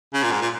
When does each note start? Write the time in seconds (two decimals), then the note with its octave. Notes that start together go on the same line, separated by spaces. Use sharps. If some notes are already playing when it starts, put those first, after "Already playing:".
0.14 C#3
0.23 A#2
0.31 G#2
0.42 A#2